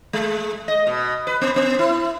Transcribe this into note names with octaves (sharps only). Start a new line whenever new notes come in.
G#3
D#5
B2
B4
B3
B3
E4